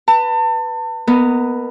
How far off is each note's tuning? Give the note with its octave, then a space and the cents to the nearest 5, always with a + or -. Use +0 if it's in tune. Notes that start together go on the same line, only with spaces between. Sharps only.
B4 +0 A5 +35
B3 +0 A#4 -20 D#5 +0